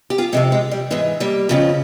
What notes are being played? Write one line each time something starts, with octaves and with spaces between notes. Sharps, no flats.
G4
F4 G#4
F2 C3 F3 G#3 C4
G#3
G3
G#2 E3 G#3
G3 A#3
F2 C#3 F3